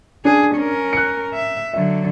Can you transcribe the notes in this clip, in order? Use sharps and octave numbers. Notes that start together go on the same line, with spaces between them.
D4 G#4
C#4 A#4
F#6 C#7
E5
D3 F#3 E5